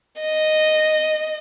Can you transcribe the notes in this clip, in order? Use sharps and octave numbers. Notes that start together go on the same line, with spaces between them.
D#5